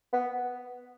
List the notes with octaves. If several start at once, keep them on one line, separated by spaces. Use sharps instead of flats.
B3